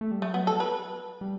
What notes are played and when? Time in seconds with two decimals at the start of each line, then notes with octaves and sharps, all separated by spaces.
0.01 A3
0.11 G3
0.22 F#3 A3
0.34 B3
0.47 A4
0.60 B4
1.21 G3